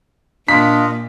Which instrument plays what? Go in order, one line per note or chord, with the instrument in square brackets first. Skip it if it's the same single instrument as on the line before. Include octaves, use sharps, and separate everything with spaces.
[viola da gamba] A#2 [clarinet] D4 [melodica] F4 D#5 [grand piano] B6